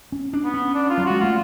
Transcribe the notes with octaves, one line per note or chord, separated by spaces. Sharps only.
C#4
D4
B3
C#4
D4
F4
F#3
G#3 F#4
A3 F4